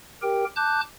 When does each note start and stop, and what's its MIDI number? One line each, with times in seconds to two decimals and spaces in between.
0.22 0.45 67
0.22 0.45 70
0.22 0.45 79
0.56 0.81 81
0.56 0.81 86
0.56 0.81 90
0.56 0.81 91